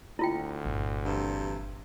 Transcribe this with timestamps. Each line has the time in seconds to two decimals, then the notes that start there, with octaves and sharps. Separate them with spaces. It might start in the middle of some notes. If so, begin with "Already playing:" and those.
0.19 D2 E4 F4 G5
0.65 G1 A#2
1.05 G2 C3 E3